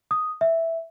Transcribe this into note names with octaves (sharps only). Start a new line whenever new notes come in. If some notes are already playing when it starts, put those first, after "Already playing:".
D#6
E5